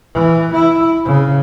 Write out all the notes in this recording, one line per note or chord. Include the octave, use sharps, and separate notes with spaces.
E3
E4
C#3